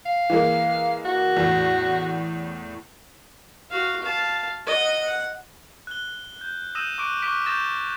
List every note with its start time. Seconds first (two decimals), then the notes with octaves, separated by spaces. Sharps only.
0.06 F5
0.30 E3 G#3 A#3
1.05 F#4
1.37 E2 A2
3.71 F#4 F5
4.03 F5 A5
4.66 D#5 F#5
5.04 F#5
5.87 F#6 G7
6.41 G6
6.75 D#6 E6 G6 A#6 D#7 E7
6.98 C#6 D6 F#6 D7
7.22 C#6 D6 F6 F#6 B6 D7
7.46 C#6 D#6 G6 A6 A#6 E7